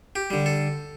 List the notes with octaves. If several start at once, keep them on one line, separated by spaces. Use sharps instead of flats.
G4
D3 G3
A4